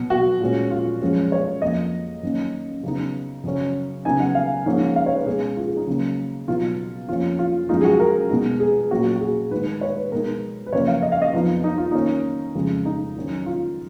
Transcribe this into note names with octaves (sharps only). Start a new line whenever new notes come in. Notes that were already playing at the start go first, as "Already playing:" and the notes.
Already playing: B2 F#3 B3
F#4
A#2 G#3 C#4
F4
F#2 F3 G#3 C#4
C#5
F2 F3 A#3 D#5
F#2 D#3 A#3 C#4
C#3 F#3 B3 D#4
F#2 C#3 F#3 C#4
C#3 F#3 B3 D#4 G#5
F#5
F5
G#2 F3 A#3 C#4
F5
C#5
B4
B2 G#3 C#4 G#4
F4
G#4
D#4
C#3 F#3 A#3
B2 F#3 B3 D#4 F4
F2 F3 A#3 C#4 F4
F4
F#2 F3 G#3 D#4 F4
G#4
F#4
A#4
B2 G#3 B3 D#4
G#4
A#2 F#3 A#3 C#4 F#4
F#4
G#4
G#2 D#3 G#3 B4
C#5
B4
B2 G#3 D#4 A#4
B4
F#2 C#3 F3 A#3 C#5
F5
D#5
F5
D#5
F2 F3 B3 D#4 F4
D#4
F4
D#3 A#3 C#4 D#4
F2 C#3 G#3
D#4
D#3 F#3 C#4
F4